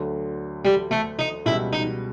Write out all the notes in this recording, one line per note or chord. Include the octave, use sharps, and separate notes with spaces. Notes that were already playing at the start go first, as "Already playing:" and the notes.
Already playing: D2 D3 F#3
G3
A3
D#4
C#2 B2 G3 E4
D#4